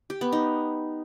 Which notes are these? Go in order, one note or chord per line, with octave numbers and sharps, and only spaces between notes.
G4
B3
D#4